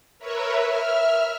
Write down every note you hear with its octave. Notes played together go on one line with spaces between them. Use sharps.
A#4 B4 C#5 E5
E5 F6